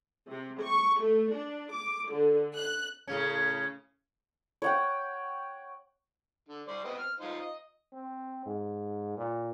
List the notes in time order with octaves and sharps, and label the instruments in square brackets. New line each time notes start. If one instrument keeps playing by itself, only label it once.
[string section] C3
C#6
A3
D4
D6
D3
F#6
[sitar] A2 C#3 C#4
[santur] C#5 F#5 G5
[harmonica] D3
G3 C5 D5
B3 C4 D#5
F6
D#4 F4 C5
D#5
[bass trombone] C4
G#2
A#2